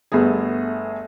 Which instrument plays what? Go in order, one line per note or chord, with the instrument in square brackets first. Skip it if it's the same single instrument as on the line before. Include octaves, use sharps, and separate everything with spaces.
[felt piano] G1 A3 B3 G#4